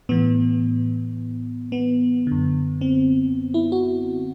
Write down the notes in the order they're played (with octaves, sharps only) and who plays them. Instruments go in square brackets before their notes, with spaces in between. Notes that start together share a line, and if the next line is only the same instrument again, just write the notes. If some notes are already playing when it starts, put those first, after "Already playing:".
[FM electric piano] A2 E3 B3
B3
F#2 D3
C4
E4
F#4